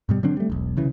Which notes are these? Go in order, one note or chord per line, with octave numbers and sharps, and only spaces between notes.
G#2 B2 G3
D3 F#3 C4 D4
G3 A3
E1 B1
C2 C#3 E3